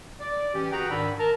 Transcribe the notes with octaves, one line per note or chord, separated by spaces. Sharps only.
D5
E3 C#4 G4
F#4 G#4 B4 F#5 G5 A#5
G#2 D#3 D4 D5 B5 E6
A#4 A5 A#5